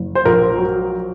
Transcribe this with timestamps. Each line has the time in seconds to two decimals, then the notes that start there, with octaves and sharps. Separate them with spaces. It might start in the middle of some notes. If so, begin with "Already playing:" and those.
Already playing: F#1
0.15 C5
0.25 A#1 A#4
0.58 F#3